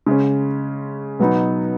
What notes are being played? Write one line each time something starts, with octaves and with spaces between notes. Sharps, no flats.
C#3 G#3 C#4
B2 F#3 B3 D#4